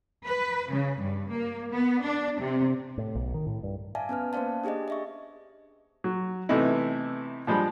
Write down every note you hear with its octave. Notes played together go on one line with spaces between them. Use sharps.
B4
C#3
G2
A#3
B3
D4
C3
A2
B1
D#3
A2
G2
D5 E5 F5 G#5 A5
B3 C#4 B4 F6
A#3 C#4 C5 D5 F5 A5
D4 G4 G#4 D5 D#5
D#5 E5 C#6
F#3
C3 E3 A3 B3 D#4 E4
F3 G3 G#3 D4 B5